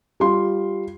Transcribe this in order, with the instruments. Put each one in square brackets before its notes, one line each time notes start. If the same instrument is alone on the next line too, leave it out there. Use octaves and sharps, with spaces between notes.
[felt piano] G3 F4 C6